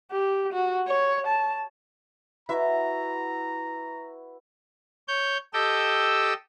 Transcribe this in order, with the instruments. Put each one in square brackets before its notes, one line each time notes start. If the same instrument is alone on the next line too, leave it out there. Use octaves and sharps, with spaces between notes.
[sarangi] G4
F#4
C#5
A5
[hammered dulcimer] E4 F#4 B4 [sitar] E5 [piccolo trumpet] A#5
[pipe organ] C#5 G6
G4 A4 D#5 G5 E6